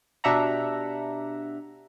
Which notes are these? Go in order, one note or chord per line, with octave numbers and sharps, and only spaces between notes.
B2 D4 G4 E5 F#5 A#5